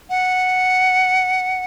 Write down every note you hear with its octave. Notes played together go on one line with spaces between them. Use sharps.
F#5